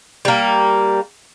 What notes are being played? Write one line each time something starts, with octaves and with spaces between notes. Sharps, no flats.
G3 A#3